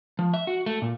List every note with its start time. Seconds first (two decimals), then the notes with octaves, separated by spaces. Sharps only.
0.19 F3
0.34 E5
0.47 F#4
0.66 A3
0.82 A#2